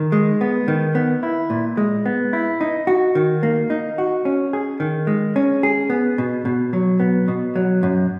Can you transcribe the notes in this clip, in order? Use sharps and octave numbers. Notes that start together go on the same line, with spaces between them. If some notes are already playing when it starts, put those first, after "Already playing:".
Already playing: D#3
G#3
B3
D#3
B3
E4
A#2
G#3
B3
E4
D#4
F#4
D#3
A#3
D#4
F#4
C#4
G#4
D#3
G#3
C#4
G#4
B3
B2
B2
F#3
B3
B2
F#3
F#2